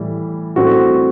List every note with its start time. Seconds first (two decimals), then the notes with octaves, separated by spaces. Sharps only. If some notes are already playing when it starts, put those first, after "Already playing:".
Already playing: A2 E3 G3
0.56 A2 G3 C4 F#4